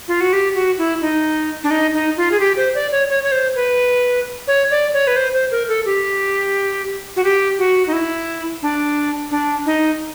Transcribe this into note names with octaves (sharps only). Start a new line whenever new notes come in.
F4
F#4
G4
F#4
E4
D#4
D4
D#4
D#4
F4
G#4
G4
C5
D5
C#5
C#5
C#5
C5
B4
C#5
D5
C#5
B4
C5
C5
A#4
A4
G4
F#4
G4
F#4
D#4
E4
D4
D4
D#4